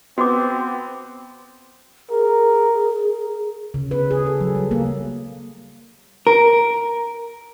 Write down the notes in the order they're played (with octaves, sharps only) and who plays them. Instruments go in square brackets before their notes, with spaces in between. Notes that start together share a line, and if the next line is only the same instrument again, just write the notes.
[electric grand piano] B3 [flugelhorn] C4 [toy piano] F#4 D6
[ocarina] G#4 [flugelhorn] A#4
[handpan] C#3
B4
G#4
A4
F#3
G3
A#3
[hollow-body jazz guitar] A#4